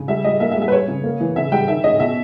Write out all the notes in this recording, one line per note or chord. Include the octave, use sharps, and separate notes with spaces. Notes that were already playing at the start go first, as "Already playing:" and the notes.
Already playing: C#3
G3 E5
G3 D#5
A#3 E5
E5
G3
E5
B4
G3 C#5
C#3
A#3
E3
C#3 E5
G3 G5
D#3 E5
C#4 D#5
B2 E5